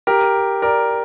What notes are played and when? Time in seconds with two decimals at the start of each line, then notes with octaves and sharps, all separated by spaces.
0.07 G4 A#4
0.62 A#4 D5